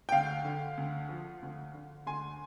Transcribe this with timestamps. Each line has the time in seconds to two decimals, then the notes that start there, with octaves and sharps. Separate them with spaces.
0.09 G5
0.12 D2 F5
0.45 D3
0.78 D2
1.09 F3
1.42 D2
1.74 D3
2.06 D2 G#5 C6